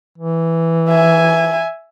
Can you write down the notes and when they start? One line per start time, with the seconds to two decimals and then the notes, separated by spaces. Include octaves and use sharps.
0.18 E3
0.89 E5 G#5